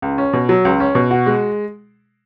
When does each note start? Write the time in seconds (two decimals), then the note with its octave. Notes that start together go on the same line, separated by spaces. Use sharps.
0.02 C#2
0.18 C#4
0.33 B2
0.49 F#3
0.65 C#2
0.80 C#4
0.95 B2
1.11 F#4
1.26 G#3